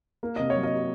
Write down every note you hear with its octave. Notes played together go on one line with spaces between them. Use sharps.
A#3
C3 D#5
C#5
F#3
D#5